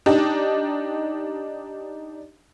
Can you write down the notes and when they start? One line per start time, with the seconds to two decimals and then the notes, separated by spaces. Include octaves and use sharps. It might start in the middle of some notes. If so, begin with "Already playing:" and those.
0.06 D4 D#4 G4